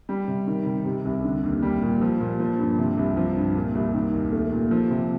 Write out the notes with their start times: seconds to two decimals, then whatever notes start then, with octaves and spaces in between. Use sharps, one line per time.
0.09 G3
0.28 C3
0.47 D#3
0.66 C3
0.85 C3
1.05 C2
1.24 D3
1.43 D#2
1.62 G3
1.82 A#2
2.01 F3
2.20 A#2
2.40 F3
2.59 G2
2.78 C3
2.97 C2
3.17 F3
3.36 G2
3.56 A#2
3.75 C2
3.94 D#3
4.14 D#2
4.32 A3
4.52 A#2
4.71 F3
4.91 C3